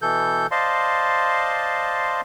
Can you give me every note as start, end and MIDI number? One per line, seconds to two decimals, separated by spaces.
0.02 0.47 47
0.02 0.47 52
0.02 0.47 69
0.02 0.47 91
0.51 2.21 72
0.51 2.21 74
0.51 2.21 75
0.51 2.21 77
0.51 2.21 81
0.51 2.21 84